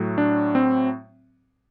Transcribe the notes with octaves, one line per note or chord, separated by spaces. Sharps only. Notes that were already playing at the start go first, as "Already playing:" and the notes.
Already playing: A2 F#3 A3
D4
C4